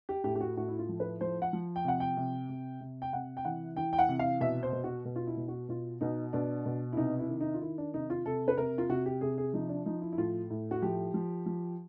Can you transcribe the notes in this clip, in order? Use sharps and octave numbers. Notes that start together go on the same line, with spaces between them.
G4
A2 G4
G4
F#4
A2 F#4
E4
F4
F3
B4
F3 C5
F#5
F3
G5
C3 F#5
G5
C3
C3
C3
G5
C3 F#5
G5
E3 F#5
E3 G5
G5
F#5
C3
F5
B2 E5
C5
B2
F#4
B2
F4
E4
B2
F#4
B2 F4
B2 D#4
B2 D4
B2
E4
C3 D#4
E4
D#3
D#4
F4
D#3 E4
D4
C3 D#4
F4
C3 A4
B4
C3 A#4
F4
C3 F#4
G4
C3 G#4
G#4
F3 D#4
D4
F3 D#4
E4
E4
A2 F4
A2
F#4
F3 G4
F3
F3